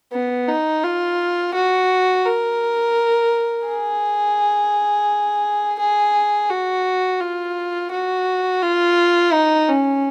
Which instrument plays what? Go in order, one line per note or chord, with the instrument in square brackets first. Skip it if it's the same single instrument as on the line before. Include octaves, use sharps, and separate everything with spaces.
[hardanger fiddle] B3
D#4
F4
F#4
A#4
G#4
G#4
F#4
F4
F#4
F4
D#4
C#4